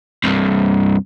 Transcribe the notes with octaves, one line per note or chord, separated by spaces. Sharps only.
C2 G2